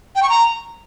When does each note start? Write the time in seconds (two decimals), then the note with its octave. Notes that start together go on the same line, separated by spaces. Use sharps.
0.16 G5
0.23 C#6
0.30 A#5